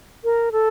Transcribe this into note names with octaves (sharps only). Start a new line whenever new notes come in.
A#4
A4